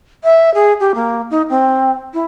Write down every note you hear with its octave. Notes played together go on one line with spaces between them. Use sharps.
E5
G#4
G4
A#3
D#4
C4
E4